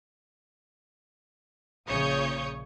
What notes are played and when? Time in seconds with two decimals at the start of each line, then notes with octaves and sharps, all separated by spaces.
1.87 A#1 C#3 C#5 C#6 D#6 G6